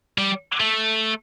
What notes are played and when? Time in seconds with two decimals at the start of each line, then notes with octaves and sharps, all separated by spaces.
0.18 G3
0.60 A3